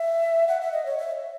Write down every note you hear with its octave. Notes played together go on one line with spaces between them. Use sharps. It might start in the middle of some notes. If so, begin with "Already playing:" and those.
Already playing: E5
F#5
E5
D#5
C#5
E5